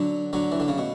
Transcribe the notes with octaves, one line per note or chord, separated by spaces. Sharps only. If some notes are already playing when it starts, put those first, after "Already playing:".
Already playing: D3 F#3
D3 F#3
E3
D3
C#3
B2